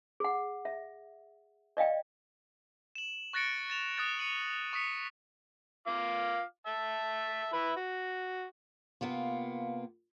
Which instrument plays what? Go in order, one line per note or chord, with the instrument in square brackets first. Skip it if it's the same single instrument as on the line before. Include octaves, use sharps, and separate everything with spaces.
[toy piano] G#4 F#5
E5
D5 D#5 F5 G5
[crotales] E7 F#7
C#6 F#6 A6 A#6 C#7 D7
A6 E7 F7
D#6 F#6 A6
C#7 D#7 F#7
C#6 D#6 B6 C#7
[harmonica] F4 F5 D6
E5 A5
E4 B4
F#4
[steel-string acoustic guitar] C3 A#3 B3 F4